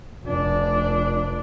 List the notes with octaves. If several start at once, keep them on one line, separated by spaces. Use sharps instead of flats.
F1 D4